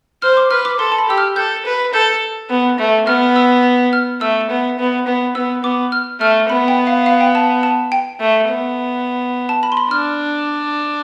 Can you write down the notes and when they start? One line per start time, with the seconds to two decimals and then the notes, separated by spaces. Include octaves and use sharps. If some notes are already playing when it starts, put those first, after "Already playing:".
0.22 C5 F6
0.37 D6
0.51 B4 F6
0.65 D6
0.79 A4 C6
0.92 A5
0.98 B5
1.08 G4 E6
1.18 F6
1.36 A4 G6
1.65 B4
1.93 A4 G6
2.50 B3
2.79 A3
3.07 B3 F6
3.36 E6
3.93 F6
4.21 A3 E6
4.50 B3
4.79 B3
5.07 B3
5.35 B3 E6
5.63 B3 D6
5.92 F6
6.20 A3 F6
6.49 B3 B5
6.68 G5
6.87 F5
7.06 F5
7.21 G5
7.35 A5
7.63 A5
7.92 G5
8.20 A3
8.49 B3
9.49 A5
9.63 B5
9.72 C6
9.77 B5
9.91 D4 F6